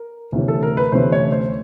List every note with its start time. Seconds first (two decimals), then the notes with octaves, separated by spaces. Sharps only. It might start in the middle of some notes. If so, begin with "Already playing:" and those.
Already playing: A#4
0.32 D2 C3 E3 A3 C#4
0.48 A4
0.63 A#4
0.77 B4
0.92 D2 C3 E3 A3 C#4 C5
1.12 C#5
1.32 C5